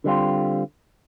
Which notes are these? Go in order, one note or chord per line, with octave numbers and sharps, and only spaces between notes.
D3 G3 C4 F4